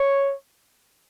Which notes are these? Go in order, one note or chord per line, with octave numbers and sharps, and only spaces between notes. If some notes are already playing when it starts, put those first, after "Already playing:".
Already playing: C#5